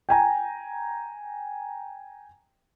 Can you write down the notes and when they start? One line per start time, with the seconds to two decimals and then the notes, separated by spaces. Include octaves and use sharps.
0.09 G5 G#5 A#5